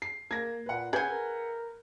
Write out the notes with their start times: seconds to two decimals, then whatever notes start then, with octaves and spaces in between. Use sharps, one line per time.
0.02 C7
0.31 A#3 G#6 A#6
0.66 A#2 B4 F#5
0.93 C#4 G#4 B4 E5 F#5 G#5 G6
1.10 A#4